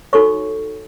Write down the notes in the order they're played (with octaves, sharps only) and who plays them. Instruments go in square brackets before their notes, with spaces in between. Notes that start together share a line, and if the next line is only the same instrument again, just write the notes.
[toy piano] D#4 F#4 A4 C#5 C#6